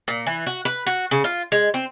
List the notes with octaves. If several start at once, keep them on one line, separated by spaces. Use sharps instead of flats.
A#2
E3
F#4
B4
F#4
C#3
F4
G#3
C4